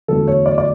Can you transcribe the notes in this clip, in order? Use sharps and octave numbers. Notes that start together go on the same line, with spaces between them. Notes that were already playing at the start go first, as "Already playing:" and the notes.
E2 D3 F#3 A3 A4
C#5
D5
D5